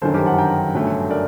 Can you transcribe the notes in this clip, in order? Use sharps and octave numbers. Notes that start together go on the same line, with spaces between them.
G1 F#2 D#3 A4 C5
G4 A#4
F#5 A5
G5 A#5
G1 F#2 F#3 A3
A#4 D5